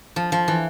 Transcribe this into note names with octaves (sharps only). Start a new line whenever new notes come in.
F3
F3
E3